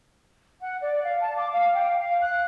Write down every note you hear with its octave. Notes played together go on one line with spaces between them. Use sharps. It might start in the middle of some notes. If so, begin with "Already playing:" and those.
F#5
D5
F5
A5
D6
F5
G5
F5
F#6